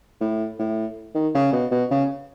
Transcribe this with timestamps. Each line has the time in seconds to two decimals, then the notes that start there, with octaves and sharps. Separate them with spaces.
0.21 A2
0.59 A2
1.15 D#3
1.34 C#3
1.52 B2
1.71 B2
1.91 C#3